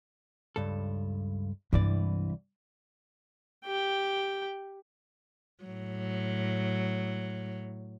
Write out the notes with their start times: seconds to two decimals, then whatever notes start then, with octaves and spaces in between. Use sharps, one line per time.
0.56 C#2 G2 A4
1.73 C2 G2 E3 G#3 D5
3.65 G4 G5
5.64 A2 F#3